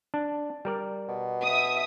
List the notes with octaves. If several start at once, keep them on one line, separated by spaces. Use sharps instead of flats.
D4
G3 A#4 D5
B2
E5 D#6